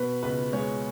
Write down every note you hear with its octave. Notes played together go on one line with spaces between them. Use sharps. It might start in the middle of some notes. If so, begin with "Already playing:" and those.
Already playing: B2 B4
C#2 B4
G#3 C#5